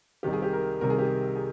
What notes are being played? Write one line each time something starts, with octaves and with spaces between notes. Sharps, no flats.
C2 C3 D#3 G4
G#4
G4
A#4
C2 C3 D#3 A#4
G#4
G4
G#4
G#4